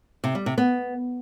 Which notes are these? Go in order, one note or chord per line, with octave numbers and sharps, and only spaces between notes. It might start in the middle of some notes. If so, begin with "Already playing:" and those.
C3
G3
C3
B3